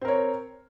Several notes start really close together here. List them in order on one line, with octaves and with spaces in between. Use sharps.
C4 A#4 C#5